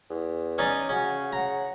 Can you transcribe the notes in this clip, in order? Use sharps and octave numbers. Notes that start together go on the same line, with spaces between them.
E2
C#4 D#4 D5
C#3 C#4 F#4
F#5 A#5